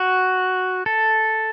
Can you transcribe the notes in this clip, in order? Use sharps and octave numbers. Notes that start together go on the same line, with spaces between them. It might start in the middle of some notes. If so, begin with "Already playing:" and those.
Already playing: F#4
A4